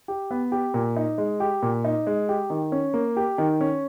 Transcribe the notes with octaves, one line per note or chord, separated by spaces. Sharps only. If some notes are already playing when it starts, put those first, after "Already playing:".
G4
B3
G4
A#2
D#4
G#3
G4
A#2
D#4
G#3
G4
D#3
C#4
A#3
G4
D#3
C#4